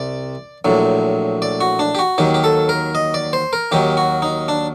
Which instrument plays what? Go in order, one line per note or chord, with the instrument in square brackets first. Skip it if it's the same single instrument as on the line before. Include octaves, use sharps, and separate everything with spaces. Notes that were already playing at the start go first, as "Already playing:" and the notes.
Already playing: [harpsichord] C2 C3 D5
A#1 A2 F#3
D5
F#4
D4
G4
F#4
D#2 D#3 F#3 G4
G4
A4
A#4
D#5
D5
C5
A#4
D#2 D#3 F#3 G4
F#4
D#4
D4